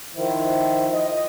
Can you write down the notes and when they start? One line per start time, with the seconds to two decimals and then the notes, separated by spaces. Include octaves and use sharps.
0.15 D#3 F3 E4
0.92 D#5